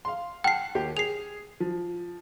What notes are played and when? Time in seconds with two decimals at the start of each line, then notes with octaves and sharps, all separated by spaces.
0.05 F5 C6
0.44 F#5 G5 A5 F6 C7
0.75 D#2 G4
0.97 G#4 C7 F7
1.60 F3